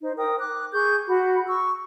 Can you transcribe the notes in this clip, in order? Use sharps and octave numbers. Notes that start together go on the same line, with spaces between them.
D#4 C5
A#4 G5 D#6
D6 F#6
G#4 C#6 G6
F#4 B5
C#6 E6